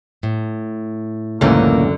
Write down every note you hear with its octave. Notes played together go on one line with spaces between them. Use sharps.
A2
C#2 F#2 A2 D3 E3 A#3 C#4